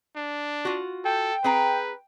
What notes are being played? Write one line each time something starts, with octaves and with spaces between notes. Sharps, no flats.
D4
F4 F#4
A4 G5
C4 G#4 B4 A#5